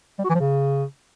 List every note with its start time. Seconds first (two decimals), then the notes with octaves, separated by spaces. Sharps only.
0.19 G3
0.24 F#4
0.29 E3
0.35 F3
0.40 C#3